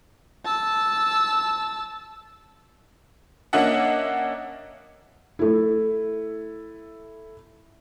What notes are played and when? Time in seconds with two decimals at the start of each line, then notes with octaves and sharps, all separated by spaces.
0.45 A5 E6
3.53 A#3 C#4 D4 D#5 E5 F#5
5.39 A3 E4